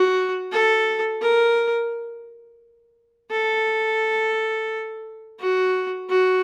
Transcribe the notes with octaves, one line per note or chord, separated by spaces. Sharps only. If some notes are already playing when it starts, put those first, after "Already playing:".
Already playing: F#4
A4
A#4
A4
F#4
F#4